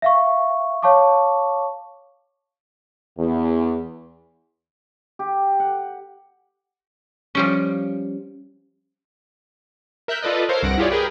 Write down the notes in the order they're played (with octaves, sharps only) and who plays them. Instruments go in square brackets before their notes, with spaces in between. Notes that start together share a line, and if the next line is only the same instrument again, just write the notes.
[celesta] E5 F5 C#6
C#5 F5 A5 C#6 D6
[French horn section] E2
[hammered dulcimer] G4
F#5
[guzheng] F3 G3 C#4
[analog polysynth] A#4 E5 F#6 G6 B6
F4 A4 B4 D5 D#5
A4 A#4 C5 C#5 F5
C2 G2 F#5 A#6 D7
E4 F4 G4 G#4 C#5 D5
G#4 A#4 B4 G5